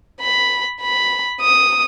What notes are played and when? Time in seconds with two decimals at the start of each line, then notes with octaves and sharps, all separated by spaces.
0.22 B5
0.81 B5
1.41 D#6